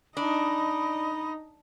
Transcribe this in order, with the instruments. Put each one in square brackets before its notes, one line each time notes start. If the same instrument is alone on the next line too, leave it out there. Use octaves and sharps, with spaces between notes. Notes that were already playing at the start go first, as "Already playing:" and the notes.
[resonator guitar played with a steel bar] D4 [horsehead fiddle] D#4 D#5 [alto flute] B5